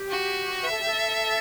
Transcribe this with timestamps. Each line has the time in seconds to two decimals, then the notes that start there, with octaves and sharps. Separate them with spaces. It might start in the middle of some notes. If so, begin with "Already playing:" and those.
Already playing: G4
0.11 F#4
0.63 B4 E5
0.71 A4
0.79 G4
0.86 A4